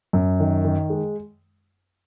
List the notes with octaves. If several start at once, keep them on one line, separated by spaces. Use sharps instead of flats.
F#2
D#3
D#3
G#3